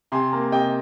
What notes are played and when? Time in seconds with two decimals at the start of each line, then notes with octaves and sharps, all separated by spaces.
0.12 C3 G#5 C6
0.33 A#3
0.52 C3 D#5 G5